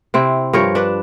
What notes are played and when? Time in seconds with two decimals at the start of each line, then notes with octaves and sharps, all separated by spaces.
0.14 C3 C4 E4
0.53 G2 F3 A#4 C#5
0.75 D4 B4